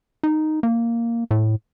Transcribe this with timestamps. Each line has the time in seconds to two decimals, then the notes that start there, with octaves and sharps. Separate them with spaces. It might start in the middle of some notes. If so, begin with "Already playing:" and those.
0.23 D#4
0.63 A#3
1.31 A2